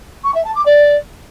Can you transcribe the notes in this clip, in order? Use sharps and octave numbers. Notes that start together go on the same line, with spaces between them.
C#6
E5
A5
D6
D5